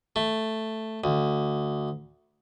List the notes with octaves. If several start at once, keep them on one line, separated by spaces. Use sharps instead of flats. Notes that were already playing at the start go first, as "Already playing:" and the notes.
A3
D2